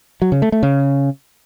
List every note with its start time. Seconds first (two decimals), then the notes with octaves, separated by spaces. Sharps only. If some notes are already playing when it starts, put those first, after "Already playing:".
0.22 F#3
0.32 C#3
0.42 A3
0.52 A3
0.63 C#3